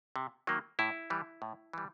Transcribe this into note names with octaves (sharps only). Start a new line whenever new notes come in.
C3
D#3 F#3 A#3
A2 E4
E3 G3
A2
E3 G3